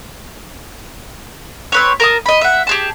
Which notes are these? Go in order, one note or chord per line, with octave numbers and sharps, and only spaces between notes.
C4 B4 C#5
A#4 A5 D#6
D#5 B5
E5 F#5
G4 G#4 A5